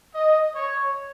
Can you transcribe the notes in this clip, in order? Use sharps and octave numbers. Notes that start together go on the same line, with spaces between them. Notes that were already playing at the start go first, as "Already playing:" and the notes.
D#5
C#5